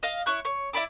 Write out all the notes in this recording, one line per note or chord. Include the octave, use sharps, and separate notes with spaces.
D#5 F5
E4 C#5 C#6 F#6
C#5
E4 D5 B5 D6